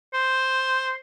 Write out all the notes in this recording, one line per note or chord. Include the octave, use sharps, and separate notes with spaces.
C5